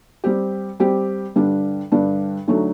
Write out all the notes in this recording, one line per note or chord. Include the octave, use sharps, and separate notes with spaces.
G3 C4 G4
G3 C4 G4
G2 D3 G3 D4
G2 D3 G3 D4
D2 D3 F#3 A3 D#4